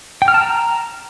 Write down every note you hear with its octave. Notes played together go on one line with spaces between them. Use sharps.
G5
F6
A5
A#5